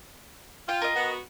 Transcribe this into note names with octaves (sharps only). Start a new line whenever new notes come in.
F4 G5
A#4 D#5
B3 F#4